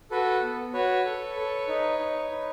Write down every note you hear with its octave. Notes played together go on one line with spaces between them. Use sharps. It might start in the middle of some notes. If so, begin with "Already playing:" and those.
F#4 A4 B4
B3
F#4 B4 C#5
A4
A4
D#4
D#4
D#4